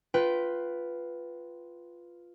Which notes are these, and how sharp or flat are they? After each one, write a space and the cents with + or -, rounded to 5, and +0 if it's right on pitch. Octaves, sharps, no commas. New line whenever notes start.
F4 +0 B4 +0 G5 -20